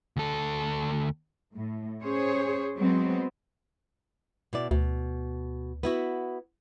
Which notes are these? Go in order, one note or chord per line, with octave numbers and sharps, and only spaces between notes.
D2 A4
A2
C#4 G#4 C5 C#5
F#3 G#3 B3 C4
B2 E4 D5
D2 B2
B3 E4 F#4